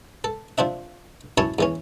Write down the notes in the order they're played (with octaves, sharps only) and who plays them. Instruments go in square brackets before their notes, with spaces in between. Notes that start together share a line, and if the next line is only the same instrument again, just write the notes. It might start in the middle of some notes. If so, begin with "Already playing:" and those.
[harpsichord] A4
F3 C4 D4 E5
F#2 C#4 E4 C#5 A5
E2 E3 C#4